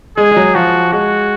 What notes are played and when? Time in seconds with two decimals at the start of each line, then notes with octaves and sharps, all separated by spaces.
0.17 G#3 G#4
0.31 G#3
0.36 F#3
0.55 F3 F#4
0.92 G#3 F#4